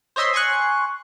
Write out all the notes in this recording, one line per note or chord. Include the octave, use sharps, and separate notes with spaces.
C5 C#5 D#5 E5 C6
G#5 C6 C#6 F#6